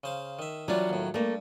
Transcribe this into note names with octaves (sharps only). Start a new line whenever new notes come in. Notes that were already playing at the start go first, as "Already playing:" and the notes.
C#3 C5 F5
D#3 E5
E3 F#3 G3 D4 F4
D#2 A2
G2 A3 A#3